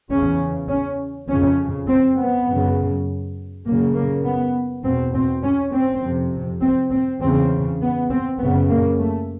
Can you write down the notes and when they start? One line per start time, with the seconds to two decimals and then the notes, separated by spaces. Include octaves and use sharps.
0.10 E2 C#3 C#4
0.69 C#4
1.29 F2 C#3 C#4
1.88 C4
2.18 B3
2.48 F#2 C#3
3.65 F#2 C#3 A#3
3.95 A#3
4.25 B3
4.84 E2 B2 C4
5.14 C4
5.43 C#4
5.73 C4
6.03 F2 C3
6.62 C4
6.92 C4
7.21 E2 C#3 C4
7.81 B3
8.10 C4
8.39 F#2 C#3 B3
8.69 A#3
9.00 A3